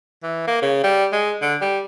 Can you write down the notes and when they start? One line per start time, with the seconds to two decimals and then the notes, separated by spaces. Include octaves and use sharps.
0.23 E3
0.47 A#3
0.62 C#3
0.83 G3
1.13 G#3
1.42 D3
1.61 G3